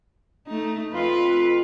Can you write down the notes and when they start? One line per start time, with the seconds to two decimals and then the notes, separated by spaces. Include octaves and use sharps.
0.47 A3 D#4
0.93 F2 F4 B4